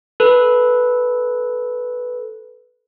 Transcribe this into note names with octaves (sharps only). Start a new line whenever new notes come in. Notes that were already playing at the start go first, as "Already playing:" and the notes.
A4 B4